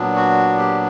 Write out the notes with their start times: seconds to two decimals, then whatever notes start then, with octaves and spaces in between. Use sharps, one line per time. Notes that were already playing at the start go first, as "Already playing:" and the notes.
Already playing: A#2 F#3 B3 D4
0.16 F#4
0.58 G4